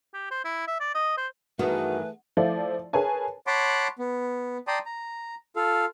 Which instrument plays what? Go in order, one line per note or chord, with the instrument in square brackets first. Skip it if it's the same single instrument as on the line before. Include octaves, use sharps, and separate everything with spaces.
[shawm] G4
C5
E4
E5
D5
D#5
C5
[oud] G2 D#3 B3 [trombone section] E3 A3 G#4 [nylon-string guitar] F#4 [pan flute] B4
[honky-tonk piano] F3 A3 E4 F4 D5
G#4 A#4 B4 C#5 G#5 A5
[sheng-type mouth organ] C#5 F#5 A5 B5 C6 D6
B3
D5 G5 A5 A#5 C6 D#6
A#5
F4 A4 F5